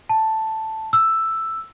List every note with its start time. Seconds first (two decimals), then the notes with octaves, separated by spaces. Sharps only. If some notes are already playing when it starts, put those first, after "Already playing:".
0.09 A5
0.93 E6